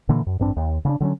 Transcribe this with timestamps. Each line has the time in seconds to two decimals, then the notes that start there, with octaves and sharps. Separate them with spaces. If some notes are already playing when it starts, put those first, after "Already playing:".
0.09 A#2 D3 E3 A#3
0.26 F#2
0.39 A1 G2 C4 D4
0.56 D#2
0.85 C#3 C#4 D4
1.00 D3 F#3 C4 C#4